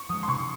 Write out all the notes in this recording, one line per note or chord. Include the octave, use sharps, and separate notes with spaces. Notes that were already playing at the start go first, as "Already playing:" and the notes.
Already playing: C#6
F3 G#3 D#6
C6
C3 C#6